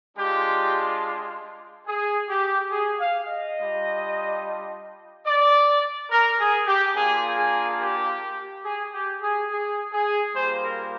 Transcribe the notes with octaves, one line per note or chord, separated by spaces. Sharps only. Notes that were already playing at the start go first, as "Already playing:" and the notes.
G#3 D4 F4 G4
G#4
G4
G#4
F5
D#5
G3 D4 F4
D5
A#4
G#4
G4
A#3 D4 F4 G#4
G#4
G4
G#4
G4
G#4
G#4
G#4
G3 A#3 F4 C5
A#4